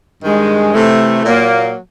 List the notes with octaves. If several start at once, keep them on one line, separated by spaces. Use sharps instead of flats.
G2 D#3 G#3
C3 E3 A3
A#2 F#3 A#3